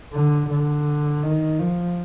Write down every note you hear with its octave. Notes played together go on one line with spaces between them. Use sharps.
D3
D3
D#3
F3